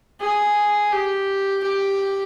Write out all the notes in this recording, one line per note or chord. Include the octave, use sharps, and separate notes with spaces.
G#4
G4
G4